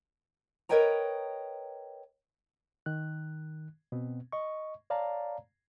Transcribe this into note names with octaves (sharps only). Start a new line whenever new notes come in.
A#4 B4 C#5 D#5 G5 A#5
D#3 F#6
B2 B3 C4
D#5 C#6
C#5 D5 F5 A5 A#5